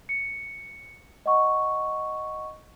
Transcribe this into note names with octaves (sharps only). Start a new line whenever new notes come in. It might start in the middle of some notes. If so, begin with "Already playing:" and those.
C#7
D#5 F#5 C#6